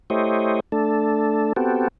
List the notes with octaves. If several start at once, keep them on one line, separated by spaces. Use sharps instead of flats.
A3 E4 G4 C5 C#5 D#5
A3 D4 A4
B3 C4 F#4 G4 A4